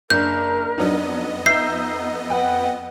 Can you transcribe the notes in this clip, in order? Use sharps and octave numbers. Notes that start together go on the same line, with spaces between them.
F#1 D4 A#4 G6
F2 F#3 B3 D4 D#4 D#5
D#4 E5 E6 G6 C7
B4 F#5 G5